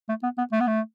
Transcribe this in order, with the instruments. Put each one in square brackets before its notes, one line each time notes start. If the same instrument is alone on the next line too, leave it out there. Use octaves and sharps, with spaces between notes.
[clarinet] A3
B3
B3
A3
B3
A3